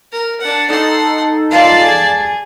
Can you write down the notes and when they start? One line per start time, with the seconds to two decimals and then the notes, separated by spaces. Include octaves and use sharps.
0.12 A#4
0.41 D4 F#5
0.70 D#4 A4 F#5 C6
1.51 F4 D5 F5 A5
1.81 G#4